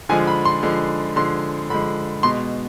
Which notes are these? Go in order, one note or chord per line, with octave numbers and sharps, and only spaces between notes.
D3 F3 G#3 G#5
B5
C6
D3 F3 G#3
D3 F3 G#3 C6
D3 F3 G#3 B5
B2 G#3 C6